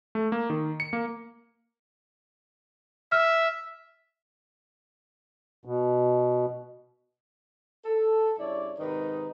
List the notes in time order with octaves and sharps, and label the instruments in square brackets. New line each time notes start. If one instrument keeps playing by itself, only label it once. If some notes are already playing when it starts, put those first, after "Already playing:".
[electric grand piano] A3
A#3
D#3
C#7
A#3
[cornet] E5 [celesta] F6
[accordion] B2
[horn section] A4
G2 C#3 E4 C#5 D5
G#2 C3 D#3 D#4 B4